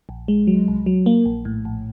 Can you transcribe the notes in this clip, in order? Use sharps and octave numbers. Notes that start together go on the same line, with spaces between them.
A#1
G#3
F#3
C2
F#3
A#3
A#1
A2
A#1